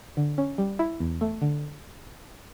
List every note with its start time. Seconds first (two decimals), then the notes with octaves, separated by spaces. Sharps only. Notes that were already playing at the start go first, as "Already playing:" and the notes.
0.17 D3
0.38 C#4
0.58 G3
0.79 E4
1.00 E2
1.21 A3
1.41 D3